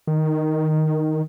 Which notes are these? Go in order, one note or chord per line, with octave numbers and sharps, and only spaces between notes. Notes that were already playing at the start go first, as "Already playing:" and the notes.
D#3